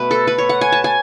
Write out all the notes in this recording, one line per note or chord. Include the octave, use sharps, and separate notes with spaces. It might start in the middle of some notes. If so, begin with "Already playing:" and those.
Already playing: B2 A3 B4
A4
B4
C#5
F#5
G#5
A5
G#5